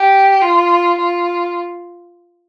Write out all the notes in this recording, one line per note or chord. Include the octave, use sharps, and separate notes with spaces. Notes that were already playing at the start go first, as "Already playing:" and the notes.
Already playing: G4
F4
F4